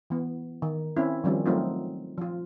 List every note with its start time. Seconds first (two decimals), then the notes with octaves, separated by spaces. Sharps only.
0.10 E3 B3
0.62 D#3
0.97 C4 C#4 E4
1.24 D#3 F3 G3 C4 C#4
1.46 F#3 A3 C4 D#4 F4
2.18 F3 F4